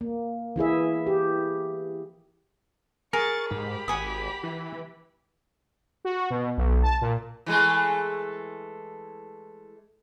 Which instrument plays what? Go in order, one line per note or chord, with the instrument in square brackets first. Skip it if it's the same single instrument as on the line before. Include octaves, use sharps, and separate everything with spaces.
[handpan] A#3
E3 E4 G#4 E5
G4
[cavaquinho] G#4 [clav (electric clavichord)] A#4 [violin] C#6 A6
[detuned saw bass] G#2 [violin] G4 B5
[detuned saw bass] G#1 [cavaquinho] F#5 G#5 D#6
[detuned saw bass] E3
[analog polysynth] F#4
B2
B1
A5
A#2
[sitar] E3 G#3 A3